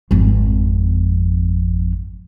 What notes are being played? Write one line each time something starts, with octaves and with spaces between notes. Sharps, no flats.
G#1 F2